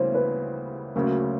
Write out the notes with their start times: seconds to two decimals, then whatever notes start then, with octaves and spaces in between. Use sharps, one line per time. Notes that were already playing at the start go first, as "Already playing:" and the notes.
Already playing: D2 C#3 E3 G3 A#3 C5 C#5
0.14 B4
0.95 D2 C#3 F#3 A#3 C#4